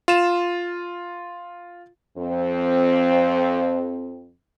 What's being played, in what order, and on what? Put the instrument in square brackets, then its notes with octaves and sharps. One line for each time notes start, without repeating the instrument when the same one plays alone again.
[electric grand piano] F4 E7
[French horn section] F2 C4